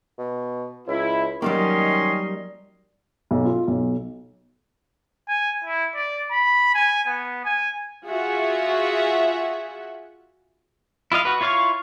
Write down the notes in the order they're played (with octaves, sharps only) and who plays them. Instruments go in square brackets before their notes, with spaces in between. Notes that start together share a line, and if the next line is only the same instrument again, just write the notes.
[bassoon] B2
[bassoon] C#2 [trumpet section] E4
[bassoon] D#3 [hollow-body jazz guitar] F#3 G3 A#3 [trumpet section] C#4 D#5 C6
[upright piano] B1
F4
B1
[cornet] G#5
E4
D5
B5
G#5
B3
G#5
[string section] F4 F#4 G#4 E5 F#5
[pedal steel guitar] E4 F4 D#5 F5
F#4 B4
E4 F4 C#5 F5 C#6